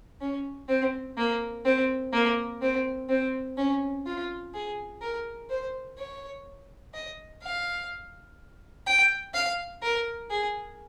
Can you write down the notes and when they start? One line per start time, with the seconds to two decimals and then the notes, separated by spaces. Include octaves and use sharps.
0.21 C#4
0.69 C4
1.17 A#3
1.65 C4
2.13 A#3
2.62 C4
3.09 C4
3.57 C#4
4.06 F4
4.54 G#4
5.02 A#4
5.50 C5
5.98 C#5
6.94 D#5
7.42 F5
8.87 G5
9.34 F5
9.82 A#4
10.31 G#4